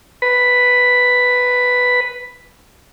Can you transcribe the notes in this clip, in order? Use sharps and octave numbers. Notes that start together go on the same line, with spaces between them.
B4 B5